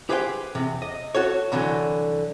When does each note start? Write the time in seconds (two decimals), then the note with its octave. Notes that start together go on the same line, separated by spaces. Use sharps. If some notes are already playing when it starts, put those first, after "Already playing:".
0.09 G4 G#4 B4 C5 F5 G5
0.55 E2 C3
0.82 D#5
1.15 F#4 A4 C#5
1.52 C2 D3 E3 F#3